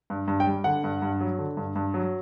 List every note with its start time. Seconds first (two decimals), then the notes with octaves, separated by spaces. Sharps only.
0.10 G2
0.28 G2
0.40 G5
0.47 G3
0.64 D3 F#5
0.84 G2
1.02 G2
1.21 F#3
1.38 D3
1.57 G2
1.76 G2
1.94 F#3